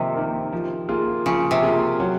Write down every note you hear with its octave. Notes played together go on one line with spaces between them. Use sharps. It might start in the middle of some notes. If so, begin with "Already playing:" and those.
Already playing: C3 D#3 F3 A#3 D#4
A#3 D#4 A#4
F3
A#3 F4 G#4
C#3 F3
C3
A#3 F4 G#4
F#3